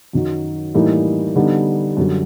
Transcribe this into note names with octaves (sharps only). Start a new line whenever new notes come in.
F#2 D#3 F#3
A2 E3 G3 A#3 D#4
D3 G3 B3 D#4
F#2 D3 G3